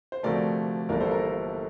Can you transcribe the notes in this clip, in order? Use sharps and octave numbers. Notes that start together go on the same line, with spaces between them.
C5
D2 C3 F3 A3 A#4 D5
G1 G2 E3 G3 A#3 A#4 D5
A4 C5
A#4
A4 C5